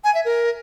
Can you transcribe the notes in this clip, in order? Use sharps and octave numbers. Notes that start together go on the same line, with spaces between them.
G#5
E5
A#4